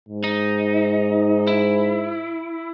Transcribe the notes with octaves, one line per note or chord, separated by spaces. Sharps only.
G#2
D#4
E4